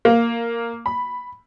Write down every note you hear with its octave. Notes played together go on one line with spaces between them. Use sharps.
A#3
B5